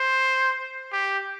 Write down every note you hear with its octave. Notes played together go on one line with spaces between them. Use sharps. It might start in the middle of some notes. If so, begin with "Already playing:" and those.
Already playing: C5
G4